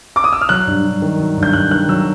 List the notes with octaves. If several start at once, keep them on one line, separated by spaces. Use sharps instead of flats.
D6
D#6
E6
F6
F#3 F#6
G2
G2
D#3
F#3
G2
G6
G2 F#6
D#3 F#6
F#3 E6